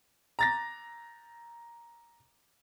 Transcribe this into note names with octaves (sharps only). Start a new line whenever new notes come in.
A#5 A6 A#6